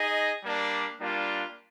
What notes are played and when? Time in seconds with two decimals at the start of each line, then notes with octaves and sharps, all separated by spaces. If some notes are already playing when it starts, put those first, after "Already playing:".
Already playing: D#4 G#4 D#5
0.42 G3 A#3 D4
0.99 G3 A#3 D4 F4